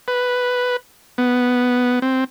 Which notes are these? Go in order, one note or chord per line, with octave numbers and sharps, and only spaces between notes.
B4
B3
C4